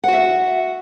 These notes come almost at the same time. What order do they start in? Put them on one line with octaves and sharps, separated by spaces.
F#5 F#4 E5